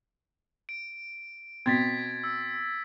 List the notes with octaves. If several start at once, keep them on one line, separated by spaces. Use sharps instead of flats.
D7
B2 C4 G#6 A6 B6
E6